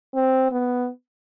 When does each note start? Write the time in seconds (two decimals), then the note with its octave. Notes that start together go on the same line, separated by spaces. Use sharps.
0.15 C4
0.51 B3